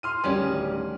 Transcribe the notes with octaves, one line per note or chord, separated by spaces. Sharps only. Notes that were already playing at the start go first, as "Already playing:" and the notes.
C6 F6 D#7
D1 D#3 G3 C#4 D#7